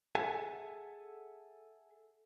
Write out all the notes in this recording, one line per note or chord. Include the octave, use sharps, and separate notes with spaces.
G#4 A4 E5 F#5 G#5 A5